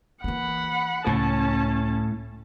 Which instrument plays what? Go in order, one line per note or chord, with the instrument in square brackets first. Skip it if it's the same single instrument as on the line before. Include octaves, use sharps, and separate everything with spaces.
[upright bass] E3 A#3 [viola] F#5 B5
[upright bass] C#2 [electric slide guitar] A2 [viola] C#4 A5